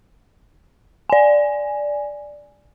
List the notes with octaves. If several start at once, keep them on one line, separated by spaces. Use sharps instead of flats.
D5 G#5